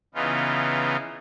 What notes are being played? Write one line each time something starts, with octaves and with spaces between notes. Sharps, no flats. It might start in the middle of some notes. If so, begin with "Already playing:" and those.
C#3 E3 B3 D#4 F4